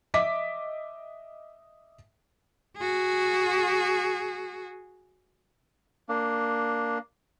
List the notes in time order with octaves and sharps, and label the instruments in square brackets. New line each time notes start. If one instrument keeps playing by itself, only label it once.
[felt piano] D#5 E5 D6 B6
[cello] F#4 G#4
[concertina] A#3 D4